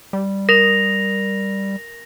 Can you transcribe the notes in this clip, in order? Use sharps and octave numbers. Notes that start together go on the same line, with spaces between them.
G3
A#4 A#6 F7